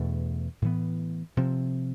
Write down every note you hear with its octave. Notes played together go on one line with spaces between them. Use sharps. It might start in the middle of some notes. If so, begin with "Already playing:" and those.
Already playing: E2 B2 A3 D4
A2 E3 B3
C3 F3 C4